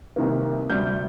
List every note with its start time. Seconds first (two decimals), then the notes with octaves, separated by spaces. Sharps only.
0.16 C2 C3 D#3 A#3
0.70 D2 C3 G3 G6